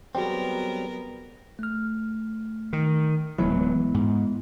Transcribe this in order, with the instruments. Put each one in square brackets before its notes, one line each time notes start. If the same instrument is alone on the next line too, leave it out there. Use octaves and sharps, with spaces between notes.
[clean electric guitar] F#3 G3 C4 [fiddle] B3 A#4 [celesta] F#4 G#4 G5
[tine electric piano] A3 F6
[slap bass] D#3
[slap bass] D1 E3 F#3 [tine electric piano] G#3 B3 E4
[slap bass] G#2